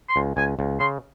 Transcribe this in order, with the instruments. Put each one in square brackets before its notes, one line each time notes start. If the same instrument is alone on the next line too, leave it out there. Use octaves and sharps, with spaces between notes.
[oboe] C6
[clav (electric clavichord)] C#2
[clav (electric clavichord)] C#2 [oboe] G#5
[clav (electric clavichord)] C#2
[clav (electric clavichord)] C#3 [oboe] C6